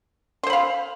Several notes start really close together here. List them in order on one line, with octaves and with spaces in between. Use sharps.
C6 C5 B5 F5